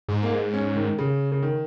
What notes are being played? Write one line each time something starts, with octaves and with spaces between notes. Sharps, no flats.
G#2
A#3
G#3
C#4
D#3
C#3
C#3
D#3